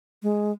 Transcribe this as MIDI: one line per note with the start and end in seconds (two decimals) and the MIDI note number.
0.23 0.52 56